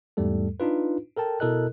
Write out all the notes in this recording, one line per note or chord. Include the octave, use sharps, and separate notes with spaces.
E2 G#2 G3 A3 A4
D4 D#4 F4 B4
A4 A#4 G5 A5
B2 E4 A4 A#4 D#5 F#6